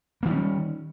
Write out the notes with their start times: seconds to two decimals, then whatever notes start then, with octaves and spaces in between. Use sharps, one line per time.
0.23 A#3
0.25 D#3
0.28 G3
0.30 C#4